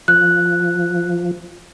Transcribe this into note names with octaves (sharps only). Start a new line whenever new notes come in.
F3 F#6